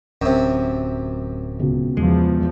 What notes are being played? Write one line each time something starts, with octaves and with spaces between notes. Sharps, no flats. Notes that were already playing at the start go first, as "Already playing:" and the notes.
D1 F#2 C3
C#2 B2
E2 F3 G#3